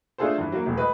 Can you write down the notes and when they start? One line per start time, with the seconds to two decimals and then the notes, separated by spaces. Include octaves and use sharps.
0.18 A3 D4 F4 G#4 A4 C5
0.38 G2 E3
0.52 F#3 A#3
0.66 E1 A2
0.77 B4 D#5